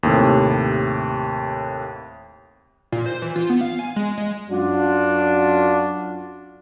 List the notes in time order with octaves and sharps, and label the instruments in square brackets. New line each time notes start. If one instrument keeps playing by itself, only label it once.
[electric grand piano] D#2 A2 C3
[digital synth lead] A#2
C5
E3
F4
B3
F5
G#5
G#3
G#3
[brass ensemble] F#2 D4 F4 F#4